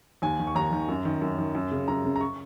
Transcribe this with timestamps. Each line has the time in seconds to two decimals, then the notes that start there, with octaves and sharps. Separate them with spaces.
0.22 D#2 G#5
0.39 D#3
0.47 C#6
0.55 D#2 A#5
0.72 D#3
0.89 F#2
1.05 D#3
1.22 F#2
1.38 D#3
1.55 F#2
1.71 C#3
1.88 F#2 A#5
2.04 C#3
2.16 A#5
2.21 C#6